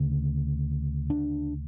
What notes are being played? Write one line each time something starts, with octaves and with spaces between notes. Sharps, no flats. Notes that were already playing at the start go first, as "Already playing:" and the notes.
Already playing: D2 C#3
D4